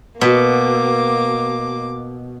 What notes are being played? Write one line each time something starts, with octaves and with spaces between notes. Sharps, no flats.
B2 A#3 F#4 B4 D6